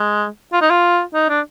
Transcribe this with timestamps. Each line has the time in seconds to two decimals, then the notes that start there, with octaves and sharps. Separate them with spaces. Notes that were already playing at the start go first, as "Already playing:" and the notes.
Already playing: G#3
0.53 F4
0.61 D#4
0.70 F4
1.14 D#4
1.29 D4